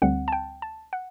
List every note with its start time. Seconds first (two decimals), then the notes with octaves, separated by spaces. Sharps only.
0.02 D2 D3 G3 C4 F#5
0.28 A5
0.32 G5
0.62 A5
0.93 F#5